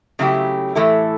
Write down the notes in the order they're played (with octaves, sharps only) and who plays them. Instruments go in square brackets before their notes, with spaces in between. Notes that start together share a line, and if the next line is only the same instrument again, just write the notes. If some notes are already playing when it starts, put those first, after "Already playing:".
[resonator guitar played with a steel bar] C#3 F#3 A3 E4 G4
A2 E3 A3 E4 A4